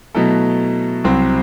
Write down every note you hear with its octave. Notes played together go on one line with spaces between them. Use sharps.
B2 F#3 A3 E4 A4
C2 C3 F#3 C4